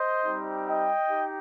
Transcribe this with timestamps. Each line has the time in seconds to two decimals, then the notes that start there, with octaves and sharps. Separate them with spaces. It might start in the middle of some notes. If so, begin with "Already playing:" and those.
Already playing: C5 D#5
0.25 G3 C4 D#4 G4
0.67 D#5 G5
1.09 D#4 G4